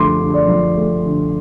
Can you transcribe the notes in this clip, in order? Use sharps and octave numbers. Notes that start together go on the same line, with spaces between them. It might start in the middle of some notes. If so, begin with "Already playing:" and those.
Already playing: D3 F3 A3 C6 D6
D3
D5
F3
A3
D3